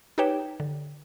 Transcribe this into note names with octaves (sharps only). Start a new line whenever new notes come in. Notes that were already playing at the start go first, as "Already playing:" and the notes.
D#4 G4 B4 C#5 G5 E7
D3